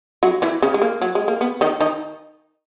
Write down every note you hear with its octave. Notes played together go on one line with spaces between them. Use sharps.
F#3 F#4
E3 E4
C#3 C#4
G#3
A#3
F#3
G#3
A#3
B3
D#3 D#4
D#3 D#4